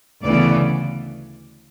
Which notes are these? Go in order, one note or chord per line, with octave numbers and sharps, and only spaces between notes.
D2 C#3 E3 B3 D5